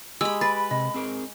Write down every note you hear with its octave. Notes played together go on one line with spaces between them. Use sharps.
G#3 G4 B5 E6
B4 B5 A6
C3 D#5
C4 G#4 A#4